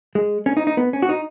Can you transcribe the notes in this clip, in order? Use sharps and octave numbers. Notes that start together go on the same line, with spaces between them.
G#3
C#4
D#4
D#4
B3
C#4
F#4
D#4